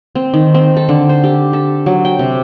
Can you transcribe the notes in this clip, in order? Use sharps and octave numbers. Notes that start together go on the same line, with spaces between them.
C4
D#3
C4
A4
D3
C5
G4
A4
F#3
G5
C3